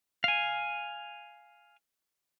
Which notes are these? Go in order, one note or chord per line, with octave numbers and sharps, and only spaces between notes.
F5 G#5